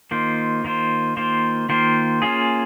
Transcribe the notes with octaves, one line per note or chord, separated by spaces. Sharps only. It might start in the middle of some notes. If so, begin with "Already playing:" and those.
D#3 A#3 F4 C5
D#3 A#3 F4 C5
D#3 A#3 F4 C5
D#3 A#3 F4 C5
A#3 C#4 F4 G#4